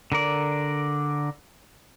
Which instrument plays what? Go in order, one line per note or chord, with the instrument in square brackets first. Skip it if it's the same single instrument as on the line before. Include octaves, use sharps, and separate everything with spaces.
[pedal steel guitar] D3 A#4 D5